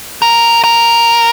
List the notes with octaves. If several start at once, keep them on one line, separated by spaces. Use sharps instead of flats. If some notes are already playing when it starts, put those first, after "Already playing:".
A#4
A#4